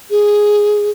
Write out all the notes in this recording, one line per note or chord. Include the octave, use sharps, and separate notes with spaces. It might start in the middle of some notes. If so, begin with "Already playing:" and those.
G#4